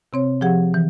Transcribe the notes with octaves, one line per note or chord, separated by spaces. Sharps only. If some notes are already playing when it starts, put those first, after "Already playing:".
C3 C4 C#5
F3 G4 G#4 F#5
E3